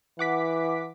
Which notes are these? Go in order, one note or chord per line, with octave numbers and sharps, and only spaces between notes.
E3 F#5 D6 B6